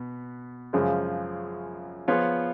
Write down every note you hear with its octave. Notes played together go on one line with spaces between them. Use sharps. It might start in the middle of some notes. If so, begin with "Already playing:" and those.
Already playing: B2 B3
F#2 C#3 F3 G#3
F3 B3 F4 G#4 C#5